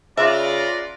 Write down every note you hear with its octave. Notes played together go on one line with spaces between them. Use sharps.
C#3 F4 B4 D5 E5 A#5